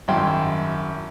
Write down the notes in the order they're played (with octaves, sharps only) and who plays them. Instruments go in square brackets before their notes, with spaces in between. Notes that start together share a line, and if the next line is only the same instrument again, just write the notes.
[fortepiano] G#1 F#2 E4 G5 C6